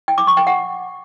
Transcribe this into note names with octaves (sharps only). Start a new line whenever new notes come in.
G5
D6
C#6
G5
F#5